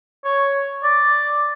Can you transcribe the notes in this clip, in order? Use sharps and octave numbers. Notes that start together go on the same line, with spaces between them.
C#5
D5